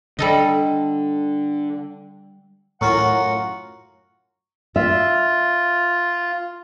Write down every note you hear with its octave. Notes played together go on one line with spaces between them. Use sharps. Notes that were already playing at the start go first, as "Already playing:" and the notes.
D3 G3 A4 D#5
F#2 A2 F4 F#4 F#5 A#5 C#6
F4 E5